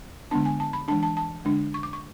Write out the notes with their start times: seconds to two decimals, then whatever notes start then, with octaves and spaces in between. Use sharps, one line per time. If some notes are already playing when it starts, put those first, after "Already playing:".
0.31 D3 G#3 B3 D4 A5
0.45 G#5
0.60 A5
0.73 B5
0.88 E3 G#3 D4 A5
1.03 A5
1.17 A5
1.45 D3 G#3 D4
1.74 C#6
1.83 D6
1.93 C#6